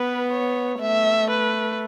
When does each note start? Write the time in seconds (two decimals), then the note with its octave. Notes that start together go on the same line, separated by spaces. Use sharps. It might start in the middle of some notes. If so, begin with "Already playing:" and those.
Already playing: B3 B4
0.32 C#5
0.81 A3 E5
1.30 B4